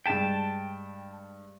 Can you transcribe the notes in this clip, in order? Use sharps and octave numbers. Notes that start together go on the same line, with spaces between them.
G2 G#3 G5 A5 B6